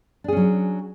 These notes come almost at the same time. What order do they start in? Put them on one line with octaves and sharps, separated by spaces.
D4 G#4 C#4 F#3